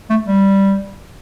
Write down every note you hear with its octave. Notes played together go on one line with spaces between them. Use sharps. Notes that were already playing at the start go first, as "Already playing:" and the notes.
A3
G3